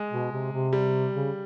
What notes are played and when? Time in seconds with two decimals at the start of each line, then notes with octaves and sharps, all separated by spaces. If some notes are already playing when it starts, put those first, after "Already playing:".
Already playing: G#3
0.11 B2
0.32 C3
0.52 C3
0.73 G3
1.14 C#3